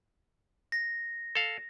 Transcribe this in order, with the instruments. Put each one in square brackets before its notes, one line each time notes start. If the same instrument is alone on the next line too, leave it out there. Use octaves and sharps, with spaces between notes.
[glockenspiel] A#6
[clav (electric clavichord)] A4 F5